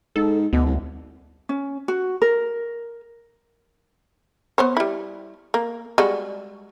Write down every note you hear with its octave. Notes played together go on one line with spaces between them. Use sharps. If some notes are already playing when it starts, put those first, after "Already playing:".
G#2 A4
D2 B2
C2
C#4
F#4
A#4
B3 C5 C#5
G3 E4
A#3
G3 G#3 F#4